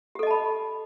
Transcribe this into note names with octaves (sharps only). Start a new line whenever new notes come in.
G4 A4 D#5 A5 B5